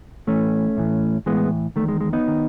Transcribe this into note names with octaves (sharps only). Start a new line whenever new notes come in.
A2 E3 A3 C#4
A2 E3
A2 E3 G#3 B3
E2 D#3 A3
G#3
G#3
B3 D#4
D#3